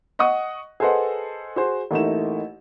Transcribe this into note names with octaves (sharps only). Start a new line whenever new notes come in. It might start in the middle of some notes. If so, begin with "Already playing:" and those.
D#5 F#5 C#6 D#6
G#4 A4 B4 C5 D#5 F#5
F#4 G#4 C5
A1 A3 A#3 D#4 E4 E7